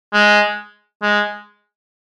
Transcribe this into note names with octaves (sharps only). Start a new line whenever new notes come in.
G#3
G#3